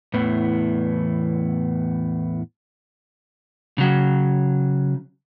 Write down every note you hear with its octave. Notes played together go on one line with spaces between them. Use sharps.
E2 A2 E3 B3
C#3 F#3